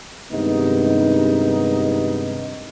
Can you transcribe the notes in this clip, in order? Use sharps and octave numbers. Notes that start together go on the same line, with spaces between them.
G2 C3 D#3 G#3 B3 D#4